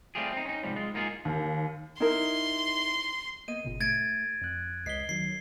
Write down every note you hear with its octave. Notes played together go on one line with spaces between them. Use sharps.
G3 A3 C4 F4 G4 G#4
C4 D#4
C#4 D#4
G#2 C3 F3 G3
G#3 F4
G#2 A#3 D#4 F4 F#4 G#4
D#2
D#4 E4 A#4 C6
A#3 B3 D#5 D#7
G1 A#2 C#3
A3 G#6 A6 D7
F2 F#6
C#2 D#5 B6 C7 G7
D#3 F#3 C7